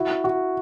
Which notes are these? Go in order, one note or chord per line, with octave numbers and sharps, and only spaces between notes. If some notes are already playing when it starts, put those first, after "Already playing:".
Already playing: E4 F#4
F#4